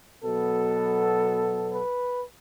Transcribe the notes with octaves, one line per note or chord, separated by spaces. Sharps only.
B2 F#3 B3 A4
B4